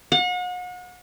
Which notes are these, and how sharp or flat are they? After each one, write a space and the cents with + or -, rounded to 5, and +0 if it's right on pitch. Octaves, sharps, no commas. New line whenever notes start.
F#5 -40